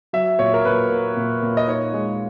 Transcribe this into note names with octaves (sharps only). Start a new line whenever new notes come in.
F#3 E5
A#2 C#5
A#4
A#2 B4
A#3
A#2
A#2
D#5
D#4 C#5
G#3